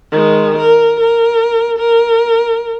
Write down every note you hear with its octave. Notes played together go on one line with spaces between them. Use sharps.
D#3 G#3
A#4
A#4
A#4